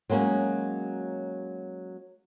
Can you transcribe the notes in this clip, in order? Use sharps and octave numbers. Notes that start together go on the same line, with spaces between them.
F#3 G#3 A#3 C#4 F#4